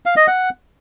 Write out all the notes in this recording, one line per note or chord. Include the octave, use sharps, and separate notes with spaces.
F5
D#5
F#5